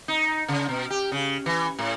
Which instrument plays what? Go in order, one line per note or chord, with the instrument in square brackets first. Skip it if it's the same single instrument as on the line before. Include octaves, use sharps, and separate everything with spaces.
[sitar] D#4
C#3
B2
G4
C#3
E3
A2